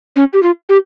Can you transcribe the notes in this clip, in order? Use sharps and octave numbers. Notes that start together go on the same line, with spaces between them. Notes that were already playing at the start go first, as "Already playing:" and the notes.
C#4
G4
F4
G4